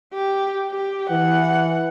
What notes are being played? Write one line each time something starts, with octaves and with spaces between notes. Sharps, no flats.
G4
G4
E3 F#5